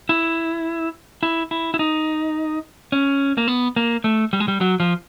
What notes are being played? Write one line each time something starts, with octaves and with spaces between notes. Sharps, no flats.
E4
E4
E4
E4
D#4
C#4
A#3
B3
A#3
A3
G3
G#3
G3
F#3
F3